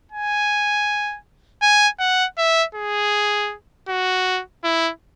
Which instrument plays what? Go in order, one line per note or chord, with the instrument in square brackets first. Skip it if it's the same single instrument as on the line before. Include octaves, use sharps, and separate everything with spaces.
[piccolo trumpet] G#5
G#5
F#5
E5
G#4
F#4
E4